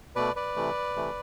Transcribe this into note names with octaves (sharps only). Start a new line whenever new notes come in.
B2 A3 B4 D5
B4 D5
C3 E3 A3
C3 E3 A3